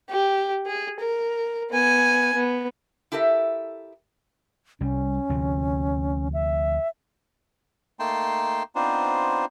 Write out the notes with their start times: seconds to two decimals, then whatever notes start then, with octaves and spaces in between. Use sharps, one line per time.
0.10 G4
0.67 G#4
1.00 A#4
1.71 B3 G#5
2.35 B3
3.12 E4 G4 A4 A#4 E5
4.81 C2 G3 C#4
5.29 D2 C3 F3
6.33 E5
8.00 A3 A#3 D#4 G5 A5 C6
8.75 B3 C4 D4 D#4 F4 C5